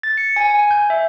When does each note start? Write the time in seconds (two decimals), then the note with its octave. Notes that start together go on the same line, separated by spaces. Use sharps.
0.03 A6
0.18 C#7
0.36 G#5
0.50 G#5
0.71 G6
0.90 E5